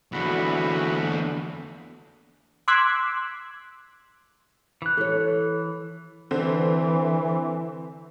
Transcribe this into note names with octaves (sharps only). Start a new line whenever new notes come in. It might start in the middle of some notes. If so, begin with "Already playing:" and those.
E2 D3 F#4 B5
C6 D6 E6 F#6 G#6 B6
E3 F#6
A4 C#5
D3 E3 C4